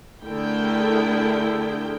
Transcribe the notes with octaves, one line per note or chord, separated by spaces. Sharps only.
D3 A3 E4 G#4 A#4 G5